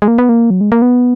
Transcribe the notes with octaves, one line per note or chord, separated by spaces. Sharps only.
G#3
A#3
B3
A#3
F#3
G#3
A#3
B3